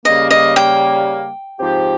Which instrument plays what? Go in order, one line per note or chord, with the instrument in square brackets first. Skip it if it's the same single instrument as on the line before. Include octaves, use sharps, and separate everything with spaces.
[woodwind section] C#3 G3 A#3 [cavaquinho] D#5
[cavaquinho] D#5
G5
[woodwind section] G#2 F3 C4 G4